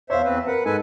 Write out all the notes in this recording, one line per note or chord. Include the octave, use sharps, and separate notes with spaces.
E2 C5 C#5 E5 F5
E2 C4 B4
A#4 B4 F#5
G#2 A4 B4 G#5